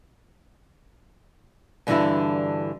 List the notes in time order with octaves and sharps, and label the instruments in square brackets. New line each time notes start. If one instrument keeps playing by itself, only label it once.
[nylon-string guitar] G2 D3 E3 G3 E4 F#4